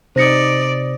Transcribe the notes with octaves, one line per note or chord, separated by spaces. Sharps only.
C3 D#4 C5 D5 D#6 A#6 C#7